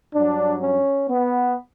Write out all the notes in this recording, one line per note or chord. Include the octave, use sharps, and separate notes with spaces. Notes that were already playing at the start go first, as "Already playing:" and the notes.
G2 F#3 D4
C#4
B3